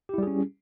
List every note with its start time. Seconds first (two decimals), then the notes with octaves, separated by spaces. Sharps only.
0.09 G4
0.14 E4
0.18 G3
0.23 G#4
0.27 C#4